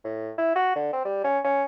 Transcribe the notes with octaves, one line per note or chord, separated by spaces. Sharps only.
A2
E4
F#4
D3
C4
G3
C#4
C#4